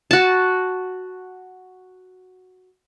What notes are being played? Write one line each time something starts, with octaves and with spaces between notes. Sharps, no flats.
F#4 A5